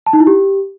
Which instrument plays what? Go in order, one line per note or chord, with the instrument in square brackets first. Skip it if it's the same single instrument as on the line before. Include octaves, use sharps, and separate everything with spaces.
[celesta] A5
D#4
E4
G4